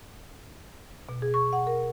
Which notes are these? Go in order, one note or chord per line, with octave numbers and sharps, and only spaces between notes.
B2
G#4
C#6
F#5
A#4